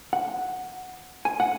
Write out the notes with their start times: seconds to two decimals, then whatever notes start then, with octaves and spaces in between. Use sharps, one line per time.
0.13 F#5
1.25 G#5
1.40 F#5